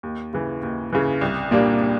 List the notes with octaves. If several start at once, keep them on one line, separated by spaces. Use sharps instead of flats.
D#2
C#3 E3
D#2
C#3 E3
C2
A#2 G3 A#3 D4